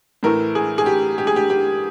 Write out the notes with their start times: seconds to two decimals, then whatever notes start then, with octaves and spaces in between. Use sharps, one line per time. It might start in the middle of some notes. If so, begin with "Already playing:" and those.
0.23 A2 E3 A3 A#4
0.55 G#4
0.78 G#4
0.86 G4
1.18 G4
1.27 G#4
1.36 G4
1.50 G4